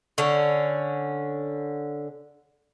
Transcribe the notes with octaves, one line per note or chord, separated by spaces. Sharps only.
D3 C#4